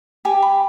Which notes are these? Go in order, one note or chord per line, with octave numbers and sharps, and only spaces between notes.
G4 G#5
B5